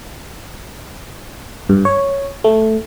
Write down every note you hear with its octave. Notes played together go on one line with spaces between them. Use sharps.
G2
C#5
A3